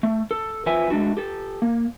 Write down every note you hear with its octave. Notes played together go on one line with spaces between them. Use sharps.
A3
A4
F2 F3 B4 E5 G#5
G#3 A3 D4 F#4
G4 A4
A#3